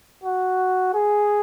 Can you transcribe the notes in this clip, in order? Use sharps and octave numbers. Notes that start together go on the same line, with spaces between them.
F#4
G#4